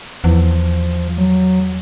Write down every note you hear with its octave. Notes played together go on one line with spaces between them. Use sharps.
E2 F3
F#3